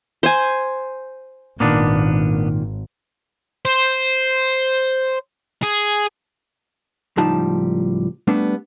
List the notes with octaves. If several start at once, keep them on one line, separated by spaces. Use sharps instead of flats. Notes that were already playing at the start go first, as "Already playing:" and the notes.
C5 G#5
G#1 A#2 D#3 A#3 B3 D4
C5
G#4
C#2 A2 F3 G3 D#4 A5
G3 A3 B3 D4